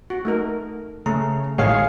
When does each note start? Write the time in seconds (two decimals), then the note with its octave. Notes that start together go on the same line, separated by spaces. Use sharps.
0.10 F#4
0.25 A3 D#4 A#4
1.06 C#3 A3 A#5
1.58 A1 A2 D#3 G#3 G#4 C#5 F5